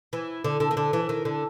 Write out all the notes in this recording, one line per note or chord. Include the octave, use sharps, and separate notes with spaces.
E3
D3
D3
D#3
D3
E3
D#3
D3